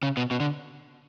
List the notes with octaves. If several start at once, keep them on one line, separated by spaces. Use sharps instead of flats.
C#3
B2
B2
D3